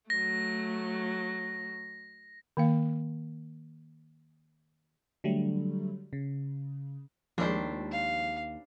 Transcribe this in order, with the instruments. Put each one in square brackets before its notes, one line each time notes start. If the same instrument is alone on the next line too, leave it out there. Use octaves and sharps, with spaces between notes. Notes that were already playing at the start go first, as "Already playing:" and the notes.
[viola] F#3 A3 [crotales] A#6
[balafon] D#3 A#3 F5
[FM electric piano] D3 F#3 G3 A3
C#3
[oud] D#2 [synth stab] F3 G#3 [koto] D4 E4 C5
[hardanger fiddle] F5